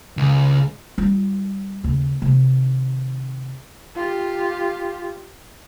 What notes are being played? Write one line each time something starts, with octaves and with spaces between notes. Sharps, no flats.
C#2
G3 F4
D#2 C#3
C3 D#3
F4 G4